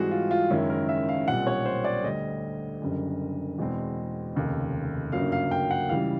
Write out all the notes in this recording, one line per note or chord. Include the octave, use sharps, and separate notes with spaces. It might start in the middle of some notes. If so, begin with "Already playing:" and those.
Already playing: G#2 E3 G3 C4 F#4 G#4
F4
F4
F#1 F#2 D#3 G#3 C#4 E4
A#4
E5
F5
B1 A#2 G3 C4 F#5
C#5
C5
D5
D2 D3 G3 D#5
F#1 F#2 D3 G3
E2 B2 G#3 C4
F1 D#2 C#3
G1 F#2 C#3 F#3 A#3 F5
F5
G5
F#5
C#2 C#3 E3 G3 F5